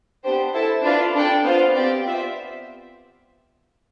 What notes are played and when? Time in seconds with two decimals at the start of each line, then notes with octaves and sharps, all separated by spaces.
0.24 B3 D4 G4 C5
0.54 E4 A4 C5 E5 A5
0.84 D4 F4 B4 D5
1.14 D4 A4 D5 G5
1.44 B3 F4 C5 F5
1.74 C4 G4 D5 G5
2.04 B3 F4 C5 E5